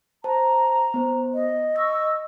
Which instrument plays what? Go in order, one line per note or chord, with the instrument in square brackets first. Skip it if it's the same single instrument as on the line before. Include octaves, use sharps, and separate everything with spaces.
[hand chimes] C5 A5 [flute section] A#5
[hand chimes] B3 C5
[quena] D#5
[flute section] C#6 E6 [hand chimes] A#6